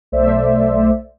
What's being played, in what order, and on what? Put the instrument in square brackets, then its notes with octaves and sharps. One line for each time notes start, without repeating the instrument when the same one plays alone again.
[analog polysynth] B1 A3 C5 D5 E5